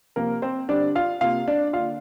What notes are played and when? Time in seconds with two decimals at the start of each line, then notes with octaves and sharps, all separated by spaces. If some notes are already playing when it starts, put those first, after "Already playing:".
0.16 C3 F3 A#3 C4 A#4
0.42 C4 C5
0.69 D3 G3 C4 D4 D5
0.95 F4 F5
1.21 C3 A#3 F4 F5
1.48 D4 D5
1.73 D3 A#3 F4 F5